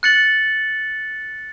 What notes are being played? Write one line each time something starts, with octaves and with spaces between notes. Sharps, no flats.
F#6 A6 C#7 F#7